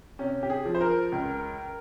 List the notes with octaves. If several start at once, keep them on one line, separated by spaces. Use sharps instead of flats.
C3 C#4
G4
G#4
F3
C5
A#4
C#2